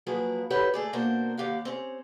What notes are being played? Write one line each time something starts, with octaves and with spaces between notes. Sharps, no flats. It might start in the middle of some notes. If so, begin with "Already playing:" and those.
F3 F#3 A#3 F#4 G#4 B4
D3 E3 G4 B4 C#5 F#5
A3 G#4 D5
B2 A#3 D4 F#4 A#4 C5
D#2 G4 F5 F#5
C4 C#4